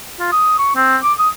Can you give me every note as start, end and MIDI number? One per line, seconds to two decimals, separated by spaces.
0.20 0.32 65
0.32 0.57 87
0.58 0.71 85
0.75 0.97 60
1.03 1.13 86
1.19 1.29 87